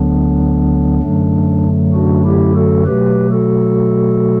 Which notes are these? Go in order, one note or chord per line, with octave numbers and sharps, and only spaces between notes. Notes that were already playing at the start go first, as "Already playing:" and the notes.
Already playing: D2 D3 F#3 B3 D4
F#2 D3 F#3 A3
D4 F#4
E4 G4
F#4 A4
B2 F#3 A3 G4 B4
F#4 A4